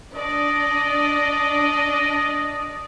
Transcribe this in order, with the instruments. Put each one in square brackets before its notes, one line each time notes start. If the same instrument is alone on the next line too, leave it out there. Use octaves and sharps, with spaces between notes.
[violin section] D4 D5 [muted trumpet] D#5